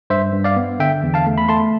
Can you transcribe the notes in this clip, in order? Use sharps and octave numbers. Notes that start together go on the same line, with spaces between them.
G2 C5 E5
G2
D5 F5
B3
D3 E5 G5
E2
F5 A5
A3
B5
A3 A5 C6